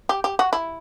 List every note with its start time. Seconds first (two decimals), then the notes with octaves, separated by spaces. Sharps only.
0.09 G4
0.24 G4
0.39 F#4
0.53 E4